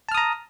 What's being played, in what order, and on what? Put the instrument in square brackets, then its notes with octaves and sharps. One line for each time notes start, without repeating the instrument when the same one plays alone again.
[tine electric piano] A5
F6
D#6
A#5